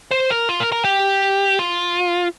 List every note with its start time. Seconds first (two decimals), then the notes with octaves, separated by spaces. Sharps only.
0.11 C5
0.30 A#4
0.49 F4
0.60 A#4
0.72 A#4
0.85 G4
1.59 F4